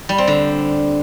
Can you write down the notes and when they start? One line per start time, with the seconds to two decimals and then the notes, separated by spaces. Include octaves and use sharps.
0.09 G3
0.18 C4
0.28 D3